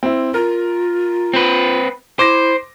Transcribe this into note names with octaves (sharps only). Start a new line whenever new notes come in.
C4 E4
F4 A#4
C4 B4
E4 C5 D6 A#6